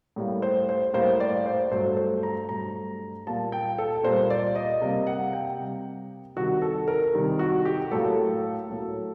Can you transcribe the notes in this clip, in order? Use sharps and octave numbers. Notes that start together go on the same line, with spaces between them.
A2 G3 A#3
C5
C5
A2 G3 A#3 C5
D5
C5
G2 F#3 A3 C5
C5
A#5
G2 F#3 A3 A#5
A#2 G3 A#3 A5
G5
A4
A#2 G3 A#3 C5
D5
D#5
C3 G3 A#3 D#5
F#5
G5
C3 G3 A#3
C3 D#3 G3 F#4
A4
A#4
C3 D#3 G3
F#4
G4
A2 F#3 A#3 A4
A2 F#3 A#3